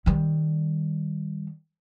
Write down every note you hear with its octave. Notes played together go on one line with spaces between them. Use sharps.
D#3 G3